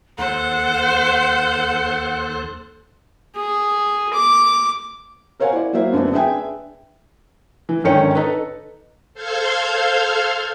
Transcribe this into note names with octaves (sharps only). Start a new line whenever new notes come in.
D#2 A4 C5 F#5 F#6
G#4
D6
A#4 C5 C#5 F5 F#5 G#5
E4 D5
F#3 A#3 E4 C5 E5
F#2 D3 A3 B3 C4 D4
D4 G#4 B4 E5 G5 G#5
E3
G#1 D3 D#3 C#4 G5 C#7
D#4 A4 B4
A4 C5 F5 F6 G6 G#6